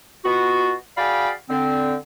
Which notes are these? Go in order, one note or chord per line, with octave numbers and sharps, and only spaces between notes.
B2 B3 F4 F#4
F#4 G#4 D5 F5 G5 B5
D3 C4